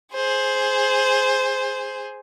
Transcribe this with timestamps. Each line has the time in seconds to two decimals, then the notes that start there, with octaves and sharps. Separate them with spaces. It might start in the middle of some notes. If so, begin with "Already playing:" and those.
0.14 G#4 C5